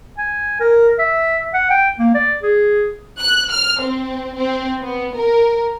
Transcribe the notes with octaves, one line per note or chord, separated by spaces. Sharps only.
G#5
A#4
E5
F#5
G5
A#3
D5
G#4
F#6
F6
C4
C4
B3
A#4